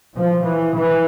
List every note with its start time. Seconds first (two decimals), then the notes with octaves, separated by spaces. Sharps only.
0.15 F3
0.45 E3
0.74 E3